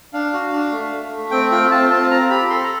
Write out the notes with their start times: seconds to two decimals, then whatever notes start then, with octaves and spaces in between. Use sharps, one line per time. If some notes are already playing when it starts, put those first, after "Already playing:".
0.13 D4 F5
0.33 F#4
0.52 D4
0.72 A3
0.93 A3
1.12 A3
1.31 C4 G5
1.51 F4 G5
1.71 F4 A5
1.90 C4 A5
2.11 C4 A#5
2.30 G4 B5
2.50 A4 C6
2.64 A#5